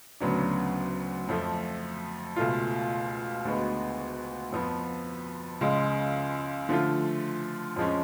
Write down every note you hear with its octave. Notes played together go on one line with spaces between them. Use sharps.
D2 C#3 F#3 B3 D4
F2 F3 A3
C#2 B2 A3 F4
D2 D3 G#3 B3 F#4
F2 F3 B3
C#2 C#3 G#3
D3 F3 A3 F4
F2 F3 G#3 C#4